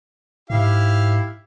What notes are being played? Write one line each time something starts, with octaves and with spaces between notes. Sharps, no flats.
G#2 E4 G4 F5